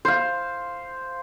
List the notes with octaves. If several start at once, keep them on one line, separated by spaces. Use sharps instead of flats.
C5 F5